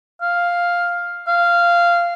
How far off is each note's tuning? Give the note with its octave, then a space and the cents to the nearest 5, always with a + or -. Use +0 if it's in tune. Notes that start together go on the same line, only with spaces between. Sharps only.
F5 +5
F5 -10